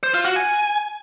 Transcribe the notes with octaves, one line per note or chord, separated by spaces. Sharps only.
C5
F4
F#4
G#5